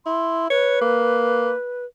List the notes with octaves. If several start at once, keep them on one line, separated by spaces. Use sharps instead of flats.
E4 C6
B4 C#5
A#3